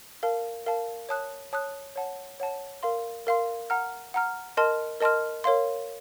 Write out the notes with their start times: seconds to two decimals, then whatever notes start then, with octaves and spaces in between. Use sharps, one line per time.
0.23 A#4 F5 A5
0.66 A#4 F5 A5
1.09 C#5 A5 D#6 F#6
1.53 C#5 A5 D#6 F#6
1.96 C#5 F#5 A5
2.40 C#5 F#5 A5
2.83 A#4 F5 C6
3.27 A#4 F5 C6
3.70 F#5 A#5 F6
4.14 F#5 A#5 F6
4.57 A#4 D#5 A5 C6 F6
5.01 A#4 D#5 A5 C6 F6
5.44 A#4 C#5 F5 C6